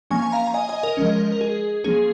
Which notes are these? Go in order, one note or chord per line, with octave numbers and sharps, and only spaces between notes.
F3 A#3 C#4 G#5 C#6
G#5
F5 A#5
A#5
D#5 G#5
D#5 G#5
A#4 D#5
F3 G#3 C#4
A#4
G#4
F3 A#3 C#4 G#4